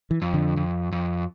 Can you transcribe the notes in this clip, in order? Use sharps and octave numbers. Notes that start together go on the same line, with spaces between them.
E3
F2
D3
F2
F2